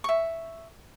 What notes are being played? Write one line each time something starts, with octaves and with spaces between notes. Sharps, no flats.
E5 C#6